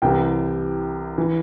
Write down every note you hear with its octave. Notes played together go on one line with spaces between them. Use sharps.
C2 C3 E3 G5
E3